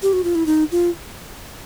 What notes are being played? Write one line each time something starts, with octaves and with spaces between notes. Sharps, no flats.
G4
F#4
F4
E4
D#4
F4